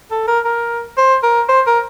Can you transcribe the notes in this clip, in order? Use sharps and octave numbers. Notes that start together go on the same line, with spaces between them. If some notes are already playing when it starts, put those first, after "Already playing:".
A4
A#4
A#4
C5
A#4
C5
A#4